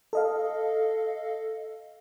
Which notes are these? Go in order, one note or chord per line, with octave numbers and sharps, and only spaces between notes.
A4 D#5 F5